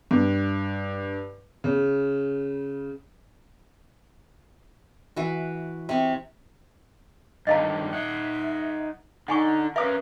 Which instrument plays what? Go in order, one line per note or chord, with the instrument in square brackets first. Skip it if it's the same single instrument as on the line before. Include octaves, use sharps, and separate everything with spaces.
[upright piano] G2
C#3
[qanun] E3 F#4
C3 C#6
[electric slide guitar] G2 D3 D#3 [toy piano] D#5 F5 A5
[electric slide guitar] D#4 F#5 [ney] E5
[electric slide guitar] D3 [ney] D#4 [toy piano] F#5 G#5 C#6
[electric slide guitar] C#4 A#4 [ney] B4 [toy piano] E5 F5 D#6